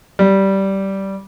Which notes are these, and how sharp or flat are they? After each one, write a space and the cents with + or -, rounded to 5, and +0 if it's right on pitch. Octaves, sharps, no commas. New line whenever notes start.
G3 -10